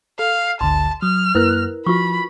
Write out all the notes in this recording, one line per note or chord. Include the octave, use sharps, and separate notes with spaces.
A4 F5
G#1 D2 D3 A5 C6
F#3 D#6 F6
F#2 A#3 E4 A#4 B4 F#6
F3 F4 F#4 B5 C#6